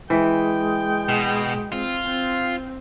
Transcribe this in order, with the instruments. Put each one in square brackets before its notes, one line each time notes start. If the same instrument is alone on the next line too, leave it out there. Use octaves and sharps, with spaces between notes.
[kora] E3 [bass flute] G#3 [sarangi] G5
[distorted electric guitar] B2
[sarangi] C4 [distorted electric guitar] F4
[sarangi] C4